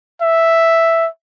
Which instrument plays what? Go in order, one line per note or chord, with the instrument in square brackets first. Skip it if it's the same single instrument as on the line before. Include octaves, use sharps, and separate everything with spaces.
[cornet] E5